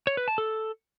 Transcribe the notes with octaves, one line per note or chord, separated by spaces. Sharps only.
C#5
B4
A5
A4